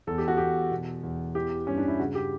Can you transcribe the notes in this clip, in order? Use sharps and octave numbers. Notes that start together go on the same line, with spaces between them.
E2 A4
G4
F#4
E2 G4
B2
E2
E3 G4
G2 C#4
D4
E4
C#3 F#4
G4